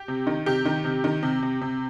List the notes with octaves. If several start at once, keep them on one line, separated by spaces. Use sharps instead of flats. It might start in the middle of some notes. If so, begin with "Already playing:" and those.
Already playing: G4
C3
D#3
C3 G4
D#3
C3
D#3
C3
C3
C3